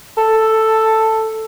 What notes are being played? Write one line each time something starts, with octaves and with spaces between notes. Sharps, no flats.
A4